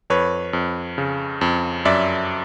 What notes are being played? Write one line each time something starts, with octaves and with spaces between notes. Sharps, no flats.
F2 B4 C#5
F2
C#3
F2
F#2 D5 E5